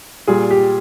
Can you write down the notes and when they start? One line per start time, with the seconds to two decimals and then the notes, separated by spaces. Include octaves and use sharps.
0.27 A#2 G3 G#4
0.51 G4